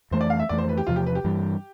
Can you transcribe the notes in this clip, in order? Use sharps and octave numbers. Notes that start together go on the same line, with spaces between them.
F2 E3 A3 C5
D5
F5
E5
F2 E3 A3 D5
C5
B4
G4
E2 C3 F3 F4
G4
B4
G4
G2 E3 G3